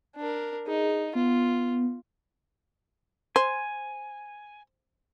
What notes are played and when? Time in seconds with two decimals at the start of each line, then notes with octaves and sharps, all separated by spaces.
0.16 D4 A#4
0.67 D#4 G#4
1.15 B3 F4
3.36 C5 G#5